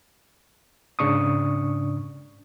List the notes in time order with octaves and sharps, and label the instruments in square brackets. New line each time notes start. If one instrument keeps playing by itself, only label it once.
[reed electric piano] G#2 C#3 D4 C#6 D#6